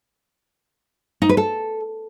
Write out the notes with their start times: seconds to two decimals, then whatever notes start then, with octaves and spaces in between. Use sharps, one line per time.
1.22 D#4
1.29 B4
1.37 A4